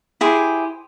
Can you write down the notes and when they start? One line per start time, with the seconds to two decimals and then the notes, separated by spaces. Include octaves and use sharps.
0.21 E4 G4 G#4 C5